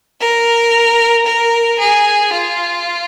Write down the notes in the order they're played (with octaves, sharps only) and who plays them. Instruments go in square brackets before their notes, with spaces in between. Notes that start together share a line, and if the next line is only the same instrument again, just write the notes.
[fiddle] A#4
A#4
G#4
F4